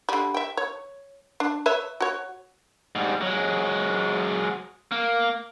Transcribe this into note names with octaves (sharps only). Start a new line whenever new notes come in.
D3 G3
E5 G5
C#5
D4
B4 C#5 E5
F#4 C#5
G#2 G3
F#3 G#3
A#3